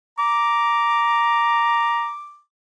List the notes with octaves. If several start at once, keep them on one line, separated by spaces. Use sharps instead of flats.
A#5 D6